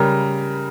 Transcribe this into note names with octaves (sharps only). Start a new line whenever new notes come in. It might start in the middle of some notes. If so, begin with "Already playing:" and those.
Already playing: C#3 G3 A#4 A#5